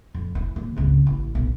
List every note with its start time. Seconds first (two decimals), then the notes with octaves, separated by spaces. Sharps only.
0.15 F2
0.35 E3
0.56 D#2
0.76 G#1 C#2
1.07 A1 E4
1.35 B1